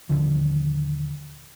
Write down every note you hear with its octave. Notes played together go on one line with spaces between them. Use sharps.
D#1 D2 D3 F3